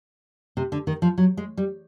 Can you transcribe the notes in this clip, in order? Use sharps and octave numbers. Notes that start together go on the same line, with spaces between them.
C3
D3
D#3
F3
F#3
G#3
G3